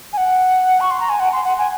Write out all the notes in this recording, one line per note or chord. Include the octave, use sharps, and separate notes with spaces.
G#5
F#5
C#6
C6
A#5
G#5
F#5
C6
F#5
G#5